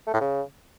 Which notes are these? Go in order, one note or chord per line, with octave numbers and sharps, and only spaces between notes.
A3
A2
C#3